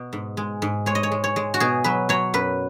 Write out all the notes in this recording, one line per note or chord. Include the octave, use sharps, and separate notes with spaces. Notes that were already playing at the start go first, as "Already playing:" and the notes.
Already playing: B2
G#2
G#3
G#2
G#3 C#5
D#5
C#5
G#3
C#5
G#3
F#4
B2 G#4
F#3 B4
F#3 C#5
F#2 B4